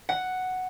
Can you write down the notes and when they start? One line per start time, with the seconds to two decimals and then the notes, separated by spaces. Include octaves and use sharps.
0.09 F#5